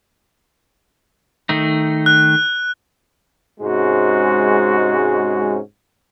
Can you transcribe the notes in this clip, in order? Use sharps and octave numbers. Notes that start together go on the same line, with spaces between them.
D#3 A3 D#4
F#6
G#2 C3 G#3 C#4 F#4